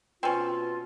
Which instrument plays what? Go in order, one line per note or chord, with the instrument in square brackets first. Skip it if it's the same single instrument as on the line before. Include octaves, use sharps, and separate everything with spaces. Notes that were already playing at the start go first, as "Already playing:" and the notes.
[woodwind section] B2 F4 [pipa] C4 C#4